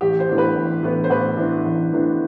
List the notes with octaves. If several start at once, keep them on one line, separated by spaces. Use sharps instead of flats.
A1 G4
C5
A2 E3 B3 D4
B4
A1
A2 E3 B3 D4
C5
A1 B4
A2 E3 B3 D4
A1
A2 E3 B3 D4